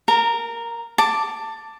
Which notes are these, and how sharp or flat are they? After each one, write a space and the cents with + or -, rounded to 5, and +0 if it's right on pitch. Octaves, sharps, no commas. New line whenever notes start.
A#4 +0 A#5 -30
A5 +15 D6 +0